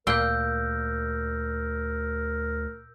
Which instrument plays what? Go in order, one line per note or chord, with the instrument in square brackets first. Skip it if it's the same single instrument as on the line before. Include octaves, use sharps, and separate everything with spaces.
[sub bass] D2 [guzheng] A#2 G5 C6 [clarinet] A#4 [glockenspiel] E6 G6